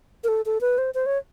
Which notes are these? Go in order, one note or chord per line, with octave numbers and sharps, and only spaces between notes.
A#4
A4
A4
B4
C5
C5
C#5